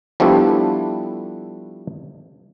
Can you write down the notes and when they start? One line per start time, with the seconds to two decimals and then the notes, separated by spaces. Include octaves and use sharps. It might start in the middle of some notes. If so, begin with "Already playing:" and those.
0.20 F3 G3 A3 B3 D4 E4